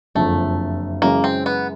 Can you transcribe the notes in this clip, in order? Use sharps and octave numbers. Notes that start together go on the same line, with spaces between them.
F#1 F2 D3 F3 A3
F#2 C#3 E3 G#3 A#3 C#4
C4
B3